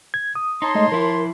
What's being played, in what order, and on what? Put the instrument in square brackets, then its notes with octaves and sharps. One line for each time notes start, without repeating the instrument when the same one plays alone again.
[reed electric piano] G#6
D#6
[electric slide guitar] D#4 [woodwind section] C#5 A5 C6
[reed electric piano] G#3 A3 D#5
[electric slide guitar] F3 E4 [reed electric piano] A#4